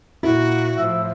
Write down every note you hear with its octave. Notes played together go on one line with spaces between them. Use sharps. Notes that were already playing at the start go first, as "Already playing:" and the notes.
A#2 A#3 E4 F#4
A2 F3 E5